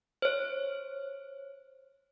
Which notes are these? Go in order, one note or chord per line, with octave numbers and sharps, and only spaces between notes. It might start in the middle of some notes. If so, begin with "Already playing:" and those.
C5 C#5